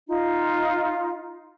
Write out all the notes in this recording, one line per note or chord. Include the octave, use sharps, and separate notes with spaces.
D#4 F4